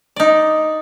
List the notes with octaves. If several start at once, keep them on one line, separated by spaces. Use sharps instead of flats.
D#4 D5